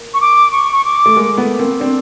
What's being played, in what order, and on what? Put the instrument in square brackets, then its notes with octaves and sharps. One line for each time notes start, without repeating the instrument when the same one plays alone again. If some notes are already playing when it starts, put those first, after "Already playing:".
Already playing: [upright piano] A#3
[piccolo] C#6
D6
C#6
C#6
D6
[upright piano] A3
G#3 A#3
A3 B3
A#3 C4
C4 D4